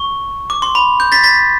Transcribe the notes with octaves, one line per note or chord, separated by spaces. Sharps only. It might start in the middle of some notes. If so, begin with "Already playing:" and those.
Already playing: C#6
D6
C6
B5
G6
A6 B6
A6 B6